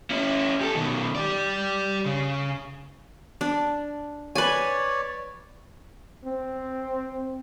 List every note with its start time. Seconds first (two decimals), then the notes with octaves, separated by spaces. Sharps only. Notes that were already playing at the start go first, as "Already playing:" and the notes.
0.11 C#4 E4
0.61 G4 A4
0.75 B2 D#3
1.16 G4 D5
2.05 C#3
3.41 D4
4.35 B4 C#5 D5 G#5
6.25 C4